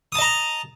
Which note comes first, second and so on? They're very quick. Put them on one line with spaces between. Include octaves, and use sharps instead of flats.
D#6 A5 D#5 A#5